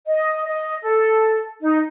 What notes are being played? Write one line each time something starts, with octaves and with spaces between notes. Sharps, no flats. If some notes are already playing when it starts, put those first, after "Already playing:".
D#5
D#5
A4
D#4